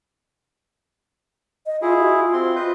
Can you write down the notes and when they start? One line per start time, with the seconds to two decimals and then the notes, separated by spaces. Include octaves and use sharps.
1.66 D#5
1.82 E4 F4 G#4
2.00 F#4
2.18 F4
2.33 C4 C6
2.56 B4 D#5 G6